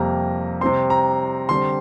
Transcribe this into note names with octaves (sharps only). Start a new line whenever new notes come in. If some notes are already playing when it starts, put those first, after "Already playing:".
Already playing: F2 C3 G3 A#3 A#5
C3 G3 C4 C6
A#5
D3 G3 C4 C6